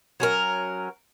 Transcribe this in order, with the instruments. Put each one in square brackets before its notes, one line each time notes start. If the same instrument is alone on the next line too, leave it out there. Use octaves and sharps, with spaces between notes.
[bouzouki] F#3 C#4 A#4